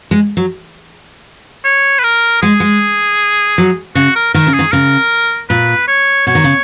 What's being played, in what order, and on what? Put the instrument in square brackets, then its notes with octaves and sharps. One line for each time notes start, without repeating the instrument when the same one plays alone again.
[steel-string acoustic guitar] G#3
F#3
[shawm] C#5
B4
A#4
[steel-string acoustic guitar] G#3 [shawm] G#4
[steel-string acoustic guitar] G#3
F#3
[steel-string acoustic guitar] C#3 [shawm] F#4
[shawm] A#4
[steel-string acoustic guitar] D#3 [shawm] A#4
[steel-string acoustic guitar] C#3
[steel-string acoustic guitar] D#3 [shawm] G#4
[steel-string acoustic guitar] C#3 [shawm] A#4
[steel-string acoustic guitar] A#2 [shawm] B4
[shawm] C#5
[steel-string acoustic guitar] B2 [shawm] C#5
[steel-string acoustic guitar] D#3
C#3